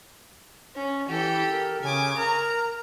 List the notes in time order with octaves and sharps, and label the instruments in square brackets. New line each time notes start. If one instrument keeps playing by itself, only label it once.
[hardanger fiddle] C#4
[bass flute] E3 [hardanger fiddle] G4 A4
[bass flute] A#4
[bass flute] C#3 [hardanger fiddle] G#5 D6
[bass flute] A#4 [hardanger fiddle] A#5